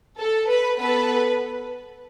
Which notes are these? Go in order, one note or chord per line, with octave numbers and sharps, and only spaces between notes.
A4
B4
B3 A4 B4